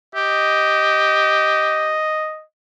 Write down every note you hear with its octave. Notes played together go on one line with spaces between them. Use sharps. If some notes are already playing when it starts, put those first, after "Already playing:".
G4 D#5